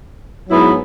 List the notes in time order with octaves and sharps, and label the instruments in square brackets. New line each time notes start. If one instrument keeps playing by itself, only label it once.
[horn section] G#2 F#3 B3 E4